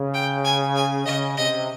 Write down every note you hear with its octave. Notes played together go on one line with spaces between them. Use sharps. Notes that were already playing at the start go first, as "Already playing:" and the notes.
Already playing: C#3
G5
G#5
G#5
C#3 D#5
C3 D#5